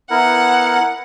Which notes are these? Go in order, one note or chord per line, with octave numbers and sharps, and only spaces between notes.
B3 E4 A#4 F#5